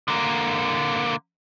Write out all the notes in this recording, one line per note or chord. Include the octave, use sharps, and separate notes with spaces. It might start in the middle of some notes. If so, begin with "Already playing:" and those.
D3 A#3